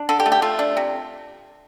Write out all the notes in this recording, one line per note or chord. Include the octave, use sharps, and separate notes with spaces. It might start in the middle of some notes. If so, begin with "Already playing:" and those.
Already playing: D4
D3 A4
G4
A3
G4
A3 F4
D4
C3